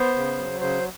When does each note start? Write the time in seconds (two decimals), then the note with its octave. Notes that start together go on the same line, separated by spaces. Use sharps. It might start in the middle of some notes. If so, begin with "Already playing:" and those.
Already playing: B3 C5
0.16 C#3
0.37 F#3
0.60 C#3 C5